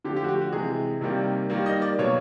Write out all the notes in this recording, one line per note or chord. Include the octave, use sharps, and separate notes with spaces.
D3 F3 A3 G4
G4
F#4
G4
F#4
C3 E3 G#3 G#4
C3 D#3 G3 A#3
D#3 G3 A#3
D#5
D5
B2 F#3 A#3 C#5